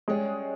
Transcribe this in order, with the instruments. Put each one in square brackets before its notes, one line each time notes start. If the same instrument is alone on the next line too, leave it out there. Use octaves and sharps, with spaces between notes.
[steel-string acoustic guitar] G3 C#4 G#4 C#5 [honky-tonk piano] G#3